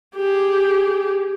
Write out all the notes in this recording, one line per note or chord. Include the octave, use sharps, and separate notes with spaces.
G4 G#4